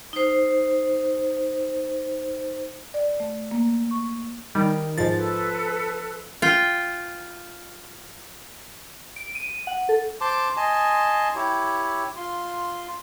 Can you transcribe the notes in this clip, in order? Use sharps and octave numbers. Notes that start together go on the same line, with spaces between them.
D#4 C5
D5
A3
A#3
C#6
D#3 G3
G#2 F3 A6
A4 B4
F4 G5
D7
D#7
F#5
A4
C5 A5 C6 D6
D#5 G#5 A5 C6
E4 G4 C#5
F4 C6